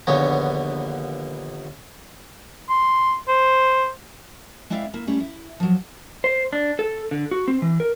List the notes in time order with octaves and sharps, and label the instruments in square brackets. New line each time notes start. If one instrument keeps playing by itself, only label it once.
[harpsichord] A#1 D#2 D3 B3 C#5
[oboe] C6
C5
[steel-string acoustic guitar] G#3 C4 E4 D5 E5 F5
A#3 E4
G3 A3 C#4 E4
E4
F3 F#3
[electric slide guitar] C5
D4
A4
D3
F#4
C4
E3
A#4